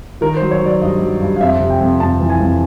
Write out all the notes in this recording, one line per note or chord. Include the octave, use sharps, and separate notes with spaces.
D#3 A#4
C5
F#3
C#5
F#3 D5
G2 D#5
F#3
G2
F5
F2 E5
C3
G5
F2
F2 A5
E3
G#5
F2